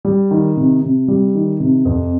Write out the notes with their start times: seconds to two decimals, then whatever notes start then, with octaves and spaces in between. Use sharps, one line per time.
0.05 G3
0.31 D#3
0.57 C3
0.82 C3
1.08 G3
1.35 D#3
1.60 C3
1.85 F2